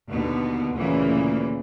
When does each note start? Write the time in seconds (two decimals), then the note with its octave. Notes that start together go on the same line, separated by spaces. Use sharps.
0.10 D#2 B2 D3 B3
0.77 D2 A#2 C#3 E3 A#3